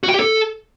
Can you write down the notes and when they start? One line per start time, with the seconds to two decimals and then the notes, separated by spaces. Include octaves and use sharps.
0.03 F#4
0.09 G5
0.14 G4
0.20 A4